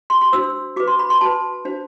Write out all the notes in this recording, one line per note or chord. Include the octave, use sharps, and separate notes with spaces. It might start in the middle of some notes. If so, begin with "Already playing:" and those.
C6
C6
D4 F#4 C5 E6
F#4 B4 D6
C6
B5
C6
F#4 B4 A5
D4 F#4 C5